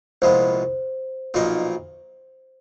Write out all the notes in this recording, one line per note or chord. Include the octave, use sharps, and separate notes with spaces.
C2 A#2 F3 G#3 B3 C5
B1 A#2 F3 A#3 D#4